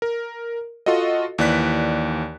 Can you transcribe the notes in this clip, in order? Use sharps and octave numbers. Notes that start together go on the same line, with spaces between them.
A#4
F4 F#4 A4 D#5
D#2 E3 D5 F#6 B6